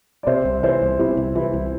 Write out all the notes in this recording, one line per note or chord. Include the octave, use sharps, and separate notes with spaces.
D5
C3 C5 E5
C2
E3 C5 E5
C2
C3 E4
C2
E3 E4
C2